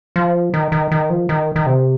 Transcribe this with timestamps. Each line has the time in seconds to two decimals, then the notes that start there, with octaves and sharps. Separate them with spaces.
0.16 F3
0.54 D#3
0.72 D#3
0.92 D#3
1.10 F3
1.29 D#3
1.56 D#3
1.66 C3